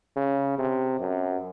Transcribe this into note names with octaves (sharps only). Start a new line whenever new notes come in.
C#3
C3
F#2